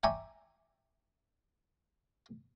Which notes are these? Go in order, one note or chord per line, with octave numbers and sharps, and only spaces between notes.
D5 E5 G5 G#5 A#5 C#6